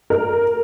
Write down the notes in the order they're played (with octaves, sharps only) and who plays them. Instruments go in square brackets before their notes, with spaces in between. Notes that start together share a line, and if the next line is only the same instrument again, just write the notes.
[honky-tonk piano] A#4